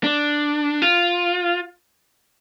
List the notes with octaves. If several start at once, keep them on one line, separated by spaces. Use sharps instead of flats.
D4
F4